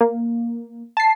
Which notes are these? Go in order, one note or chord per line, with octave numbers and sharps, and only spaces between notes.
A#3
A5 C7